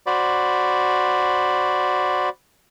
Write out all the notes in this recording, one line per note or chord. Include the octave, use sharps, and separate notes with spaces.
F#4 C5 D5 B5